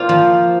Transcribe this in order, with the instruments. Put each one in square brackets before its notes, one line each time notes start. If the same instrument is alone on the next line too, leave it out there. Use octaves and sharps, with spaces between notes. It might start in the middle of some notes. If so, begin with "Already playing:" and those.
Already playing: [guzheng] A#3 F4 [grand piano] C5
[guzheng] F3